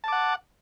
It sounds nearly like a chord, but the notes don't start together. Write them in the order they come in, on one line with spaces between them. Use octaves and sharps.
A5 D6 F#5